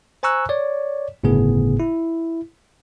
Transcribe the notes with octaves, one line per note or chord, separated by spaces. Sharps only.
C5 G#5 A#5 C#6 E6 F#6
C#5 D5
G1 A2 C#3 B3 G#4
E4